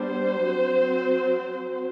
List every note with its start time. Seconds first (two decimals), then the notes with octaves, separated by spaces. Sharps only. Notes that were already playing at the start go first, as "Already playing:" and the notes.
Already playing: G3 B3 D4 C5
0.43 F#3 C4